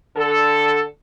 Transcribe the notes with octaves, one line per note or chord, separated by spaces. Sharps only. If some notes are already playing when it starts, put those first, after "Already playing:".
D3 A4